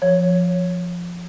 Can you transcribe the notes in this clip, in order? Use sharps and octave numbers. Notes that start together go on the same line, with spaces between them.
F3 C#5